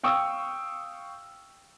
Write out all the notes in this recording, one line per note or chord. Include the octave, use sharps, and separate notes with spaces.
F5 G5 C#6 D#6 E6